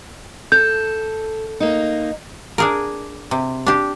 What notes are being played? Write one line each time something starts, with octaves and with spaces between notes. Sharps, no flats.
A4 G6
A#3 D#4
D4 G#4 A#4
C3
D4 G4